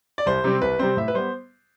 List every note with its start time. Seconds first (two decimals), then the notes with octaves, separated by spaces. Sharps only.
0.18 D5
0.26 C2 C5
0.44 C3 G3 C4
0.62 C2 B4
0.79 C3 G3 C4 C5
0.97 A2 E5
1.08 B4
1.14 G3 B3 C5